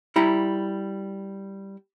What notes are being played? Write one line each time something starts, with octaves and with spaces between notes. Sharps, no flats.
G3 E4 A#5